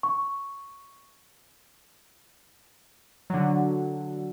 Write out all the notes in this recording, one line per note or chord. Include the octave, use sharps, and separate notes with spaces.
C#6
D3 F#3